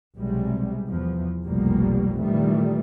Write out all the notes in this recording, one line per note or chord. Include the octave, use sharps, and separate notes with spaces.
B1 C3 G3 G#3
E2 F3
F1 B1 B2 F3 G3 A#3
A#2 D#3 E3 G3 A3